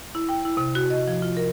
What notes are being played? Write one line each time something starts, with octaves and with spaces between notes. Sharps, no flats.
E4
G5
E4
C3
F#4
D#5
F3
F4
A#4